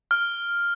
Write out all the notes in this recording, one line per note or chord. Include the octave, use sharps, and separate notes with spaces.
F6